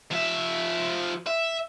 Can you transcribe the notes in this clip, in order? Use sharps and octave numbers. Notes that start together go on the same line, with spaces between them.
F3 E5
E5